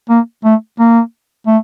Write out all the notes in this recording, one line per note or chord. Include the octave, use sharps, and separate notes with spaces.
A#3
A3
A#3
A3